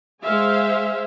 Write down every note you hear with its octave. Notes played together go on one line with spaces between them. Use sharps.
G#3 C5 E5 F5 G#5